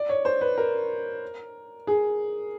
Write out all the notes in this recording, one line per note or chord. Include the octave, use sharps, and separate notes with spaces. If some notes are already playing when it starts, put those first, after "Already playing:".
Already playing: D5
C#5
C5
B4
A#4
G#4